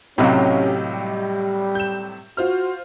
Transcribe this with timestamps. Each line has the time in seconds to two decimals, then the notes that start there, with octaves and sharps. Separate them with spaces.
0.18 A2 C3 F#3 C#4 G4 D#5 F5
0.91 G3
1.75 G6 E7
2.37 F4 F#4 C5 F6